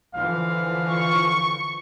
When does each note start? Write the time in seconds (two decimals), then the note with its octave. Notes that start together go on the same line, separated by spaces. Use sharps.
0.15 D3 E3 F3 F5
0.90 C#6